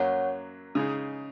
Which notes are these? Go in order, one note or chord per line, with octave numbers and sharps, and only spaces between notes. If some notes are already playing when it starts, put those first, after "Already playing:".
Already playing: F#2 F#3 A#3 C#5 F#5
C#3 G#3 D#4